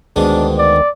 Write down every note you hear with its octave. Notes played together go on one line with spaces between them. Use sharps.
D2 G#2 B2 D#3 G#3 D4
D5